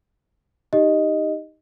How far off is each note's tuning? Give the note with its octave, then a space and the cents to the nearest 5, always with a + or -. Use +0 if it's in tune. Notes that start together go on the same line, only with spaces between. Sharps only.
D#4 +0 G4 +0 D#5 +0